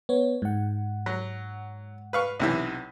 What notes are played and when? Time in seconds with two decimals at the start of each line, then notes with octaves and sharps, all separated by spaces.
0.09 B3 C#5
0.42 G#2 F#5
1.06 F#3
2.13 B4 F5 C#6
2.40 B1 C3 E3